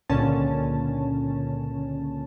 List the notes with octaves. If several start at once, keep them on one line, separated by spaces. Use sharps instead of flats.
C#2 A#2 D3 C#4 A5